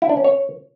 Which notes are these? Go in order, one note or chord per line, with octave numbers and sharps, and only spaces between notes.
E4
D4
C#4
C#5